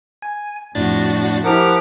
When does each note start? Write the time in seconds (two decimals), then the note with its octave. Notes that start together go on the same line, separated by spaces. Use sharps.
0.22 G#5
0.75 F2 A2 D4 F#4 A6
1.44 F3 E4 G4 A#4 F#5 D6 F6